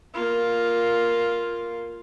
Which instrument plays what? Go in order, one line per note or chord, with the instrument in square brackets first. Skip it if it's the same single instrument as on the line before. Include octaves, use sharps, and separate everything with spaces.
[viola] A#3 F4